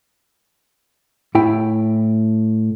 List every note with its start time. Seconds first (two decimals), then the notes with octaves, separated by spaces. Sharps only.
1.35 A2 E4 G5